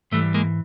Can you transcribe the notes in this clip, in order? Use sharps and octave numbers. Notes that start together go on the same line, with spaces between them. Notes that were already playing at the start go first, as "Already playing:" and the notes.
G#2 E3 G3 A3
G#3 A#3